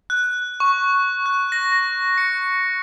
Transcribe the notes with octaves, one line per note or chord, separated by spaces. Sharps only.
F#6
C#6
F#6
A#6
A#6
C#7